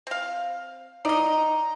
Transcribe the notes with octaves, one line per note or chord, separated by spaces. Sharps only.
C4 F5
D#4 D5 D#5 A#5